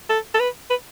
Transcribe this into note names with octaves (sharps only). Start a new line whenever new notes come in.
A4
A4
B4
B4